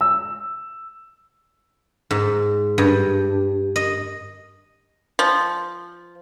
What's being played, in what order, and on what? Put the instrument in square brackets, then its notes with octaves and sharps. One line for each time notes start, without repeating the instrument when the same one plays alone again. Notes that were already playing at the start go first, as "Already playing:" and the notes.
[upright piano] E6
[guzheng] G#2
G2
D#5
[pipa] F3